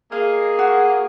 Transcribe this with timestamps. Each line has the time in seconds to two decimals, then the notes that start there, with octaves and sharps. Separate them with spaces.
0.12 A#3 G#4 D#5 F5
0.59 F#4